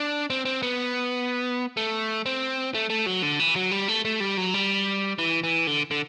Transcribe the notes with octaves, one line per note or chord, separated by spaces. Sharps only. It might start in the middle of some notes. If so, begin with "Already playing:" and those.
Already playing: D4
C4
C4
B3
A3
C4
A3
A3
F#3
D3
E3
F#3
G3
A3
A3
G3
F#3
G3
E3
E3
D3
D3